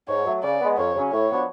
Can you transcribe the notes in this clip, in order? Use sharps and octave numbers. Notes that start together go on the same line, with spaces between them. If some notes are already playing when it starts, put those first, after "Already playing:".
G#2 C#5
F#3 A3
C#3 D5
G#3 B3
F2 C#5
C#3 F#3 C#4
A2 C#5
F3 B3 D4 F#4